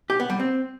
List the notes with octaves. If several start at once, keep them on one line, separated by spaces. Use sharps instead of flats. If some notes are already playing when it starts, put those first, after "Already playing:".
G4
B3
G3
C4